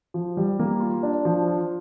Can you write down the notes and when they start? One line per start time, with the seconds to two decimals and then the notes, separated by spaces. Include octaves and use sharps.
0.14 F3
0.37 G3
0.59 A#3
0.80 F4
1.03 D4
1.25 F3
1.47 F4